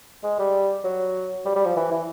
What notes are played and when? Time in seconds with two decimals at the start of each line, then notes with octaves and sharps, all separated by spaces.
0.24 G#3
0.39 G3
0.84 F#3
1.45 G3
1.56 G3
1.65 F3
1.76 E3
1.92 E3